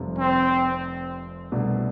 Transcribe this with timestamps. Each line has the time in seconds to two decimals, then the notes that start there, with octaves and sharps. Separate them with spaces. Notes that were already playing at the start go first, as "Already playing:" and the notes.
Already playing: F1 F2 C3 G3
0.18 C4
1.52 C2 B2 A3 D4